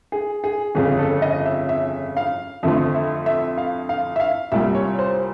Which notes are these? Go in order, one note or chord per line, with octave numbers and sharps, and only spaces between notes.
G#4
G#4
G1 F2 C#3 G#4
A4
D#5
E5
E5
F5
F2 D3 F3 A3 E5
E5
E5
F5
F5
E5
F5
C2 A#2 G3 E5
C#5
C5